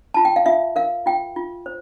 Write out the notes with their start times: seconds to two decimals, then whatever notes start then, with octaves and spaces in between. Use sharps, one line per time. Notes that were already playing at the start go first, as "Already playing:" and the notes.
0.14 F4 A5
0.25 G5
0.36 F5
0.46 F4 E5
0.76 A#4 F5
1.06 F4 G5
1.36 F4
1.66 C5